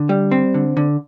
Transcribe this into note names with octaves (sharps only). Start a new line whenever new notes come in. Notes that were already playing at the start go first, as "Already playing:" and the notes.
Already playing: D3
G3
C4
D3
D3